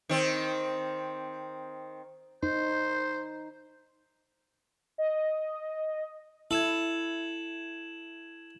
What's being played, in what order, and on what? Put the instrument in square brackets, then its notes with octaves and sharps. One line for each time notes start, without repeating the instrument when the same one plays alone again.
[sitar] D#3 C4
[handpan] D#4 [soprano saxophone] C5 [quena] G6
[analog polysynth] D#5
[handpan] E4 [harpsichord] A4 [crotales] G#6 E7 F#7